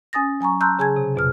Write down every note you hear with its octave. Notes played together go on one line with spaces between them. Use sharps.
C#4 G#5 D#6 A6 A#6
F#3 G#5 A#5 C#6
A5 A#5 C6 E6 F#6 G6
C#3 G#4 G#5 A5 G#6
C3
F2 B2 F6